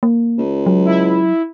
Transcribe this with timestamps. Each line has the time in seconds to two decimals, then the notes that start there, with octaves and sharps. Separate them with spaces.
0.03 A#3
0.38 C#2
0.66 F#3
0.86 E4